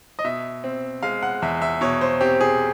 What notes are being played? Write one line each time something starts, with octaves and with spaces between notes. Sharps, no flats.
D#5
B2 E5
C4
G#3 F5
F#5
E2 E5
E5
B2 C#5
C5
C4 G4
G#4